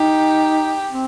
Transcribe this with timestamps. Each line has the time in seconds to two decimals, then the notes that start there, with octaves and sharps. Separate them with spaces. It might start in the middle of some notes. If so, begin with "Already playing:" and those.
Already playing: D#4 G4
0.92 C4